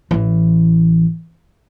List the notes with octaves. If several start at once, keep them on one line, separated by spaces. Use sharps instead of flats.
A1 E3